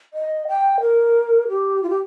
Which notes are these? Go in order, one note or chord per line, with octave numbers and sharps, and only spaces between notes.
D#5
G5
A#4
G4
F4
G4